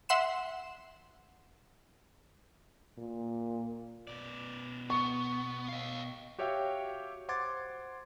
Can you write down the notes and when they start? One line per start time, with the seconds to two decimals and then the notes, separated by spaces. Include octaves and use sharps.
0.09 E5 F#5 C6 E7
2.98 A#2
4.07 B2 D5
4.90 B3 C#6
5.69 D#5 F5
6.39 F#4 G4 C#5 E5 F5 G5
7.28 C5 F#5 C6 D6 G#6 A6